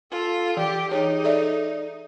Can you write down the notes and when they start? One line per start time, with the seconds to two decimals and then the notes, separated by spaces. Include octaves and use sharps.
0.11 F4 A4
0.57 E3 G4
0.91 D#4 G#4 C#5
1.24 A4 D5 E5